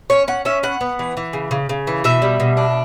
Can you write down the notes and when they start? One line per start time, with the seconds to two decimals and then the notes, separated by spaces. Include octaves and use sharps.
0.10 C#4 C#5
0.28 C#4 F#5
0.45 C#4 E5
0.63 B3 F#5
0.81 B3
0.99 E3
1.17 E3
1.33 C#3
1.51 C#3
1.69 C#3
1.87 E3
2.04 B2 E5
2.22 G3
2.40 B2
2.57 D4